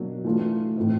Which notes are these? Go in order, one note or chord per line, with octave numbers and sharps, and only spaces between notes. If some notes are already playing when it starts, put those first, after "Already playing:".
Already playing: B2 F#3 A#3 D4
E3 A3 D4 F4
A2 E3 A3 C4 D#4